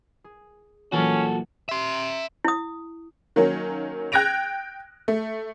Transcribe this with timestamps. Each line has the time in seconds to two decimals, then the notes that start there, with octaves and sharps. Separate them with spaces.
0.24 G#4
0.92 A#2 E3 F#3 C#4 F#4 A4
1.69 E5 C6
2.45 E4 D#6
3.36 D#3 F#3 A#3 C#4
4.12 G5 F#6 G#6 A#6 D7 F7
5.08 A3